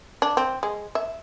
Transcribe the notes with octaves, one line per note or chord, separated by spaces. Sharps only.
D4
C4
G#3
E5